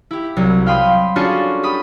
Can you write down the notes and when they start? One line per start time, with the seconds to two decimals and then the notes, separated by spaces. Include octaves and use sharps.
0.11 E4 G4
0.37 C2 F#3
0.66 F5 G5 B5 C6 D#6
1.16 C#4 D4 F4 F#4 G#4 A4
1.63 G4 B5 D#6